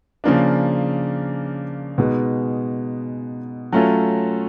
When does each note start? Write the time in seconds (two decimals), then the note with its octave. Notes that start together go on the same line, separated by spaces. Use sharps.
0.24 C#3 F3 A#3 D4
1.98 B2 G#3 B3 D#4 G#4
3.72 F#3 A3 C#4 F4 A4